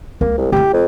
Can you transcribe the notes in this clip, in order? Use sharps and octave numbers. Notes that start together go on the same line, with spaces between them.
C#2 A#3
C2
A3 E4 G4
F2